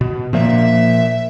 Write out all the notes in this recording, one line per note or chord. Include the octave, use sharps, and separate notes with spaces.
B2
A#2 F3 A#3 E5